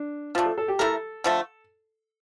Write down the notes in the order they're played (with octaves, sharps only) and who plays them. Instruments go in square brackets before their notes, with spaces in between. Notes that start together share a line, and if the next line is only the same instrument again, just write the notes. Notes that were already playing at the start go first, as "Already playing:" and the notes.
Already playing: [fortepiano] D4
[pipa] F3 A3 D4 [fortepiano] F4
[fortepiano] A4
A4
G4
[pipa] A3 E4 A#4 [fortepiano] A4
[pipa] D3 F3 A3